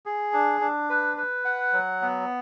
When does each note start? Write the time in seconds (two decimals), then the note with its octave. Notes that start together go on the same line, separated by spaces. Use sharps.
0.06 G#4
0.33 D4
0.61 D4
0.90 B4
1.17 B4
1.45 F#5
1.73 F#3
2.01 B3